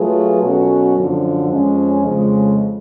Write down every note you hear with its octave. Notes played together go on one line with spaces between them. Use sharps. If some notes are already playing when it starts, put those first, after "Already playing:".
Already playing: F#3 A3 F4 G#4 B4
B2 F#3 C#4 F#4 A4
F#2 D3 F3
F2 F3 G#3 C#4
F2 C#3 F3 G#3